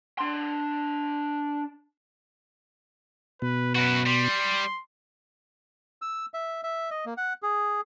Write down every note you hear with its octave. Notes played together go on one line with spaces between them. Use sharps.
D4 C6
B2 B4
F#2 F#4 B4
G3 C6
E6
E5
E5
D#5
A#3
F#5
G#4